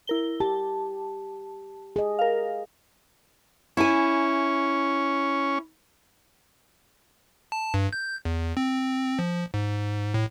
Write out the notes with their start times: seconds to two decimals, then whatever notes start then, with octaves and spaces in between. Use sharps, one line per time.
0.07 E4 A#4 G7
0.40 G4 A5
1.96 G#4 D#5
2.19 A#4 F5
3.77 C#4 E4 G#5
7.52 A5
7.74 G2
7.93 G6
8.25 E2
8.57 C4
9.19 F3
9.54 G#2
10.14 A2